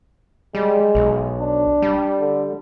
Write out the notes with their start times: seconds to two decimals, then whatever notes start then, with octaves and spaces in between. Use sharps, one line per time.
0.55 G3 G#3
0.95 B1
1.41 D4
1.82 G3
2.20 D3